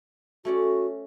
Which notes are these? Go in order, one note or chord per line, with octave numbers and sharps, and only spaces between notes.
A3 C#4 F#4 D5